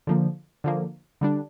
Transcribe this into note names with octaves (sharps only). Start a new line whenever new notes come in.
D3 F3 A#3
D3 F3 A#3
D3 G3 D4